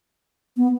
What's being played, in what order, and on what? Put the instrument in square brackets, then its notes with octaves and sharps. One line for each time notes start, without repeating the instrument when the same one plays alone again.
[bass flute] B3